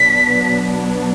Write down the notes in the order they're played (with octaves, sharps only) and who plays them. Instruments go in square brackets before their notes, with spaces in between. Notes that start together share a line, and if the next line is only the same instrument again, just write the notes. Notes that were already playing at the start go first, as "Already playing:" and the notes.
Already playing: [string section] B2 F#3 B3 D4 [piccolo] B6